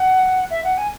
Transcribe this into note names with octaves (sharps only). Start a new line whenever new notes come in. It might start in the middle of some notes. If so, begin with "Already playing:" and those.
Already playing: F#5
E5
F#5
G#5